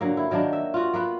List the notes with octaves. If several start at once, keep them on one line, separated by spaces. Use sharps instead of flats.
D3 F#3 A#3
E4
D#3 F#3 A#3 D4
E5
F4 F#4
A#3 B3 B4